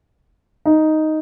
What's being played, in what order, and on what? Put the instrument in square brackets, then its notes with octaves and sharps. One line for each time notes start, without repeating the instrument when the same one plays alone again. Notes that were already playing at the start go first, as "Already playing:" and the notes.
[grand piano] D#4